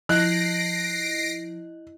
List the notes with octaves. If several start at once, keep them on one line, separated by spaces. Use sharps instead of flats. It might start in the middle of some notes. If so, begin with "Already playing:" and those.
F3 E4 D#5 F#6 A#6 C7 D7